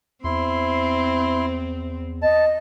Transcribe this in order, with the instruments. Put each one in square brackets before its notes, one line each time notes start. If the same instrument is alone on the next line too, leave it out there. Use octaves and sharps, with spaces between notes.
[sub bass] E2 [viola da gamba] C4 [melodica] E4 C6
[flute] D#5 [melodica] A5